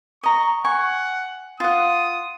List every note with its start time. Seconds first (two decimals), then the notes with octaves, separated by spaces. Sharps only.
0.23 D#5 A#5 C#6
0.64 F#5 G#5 C#6
1.60 F4 F#5 D#6